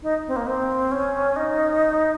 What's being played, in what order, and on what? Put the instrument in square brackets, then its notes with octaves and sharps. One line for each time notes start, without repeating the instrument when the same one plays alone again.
[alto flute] D#4
C4
A#3
C4
C#4
D#4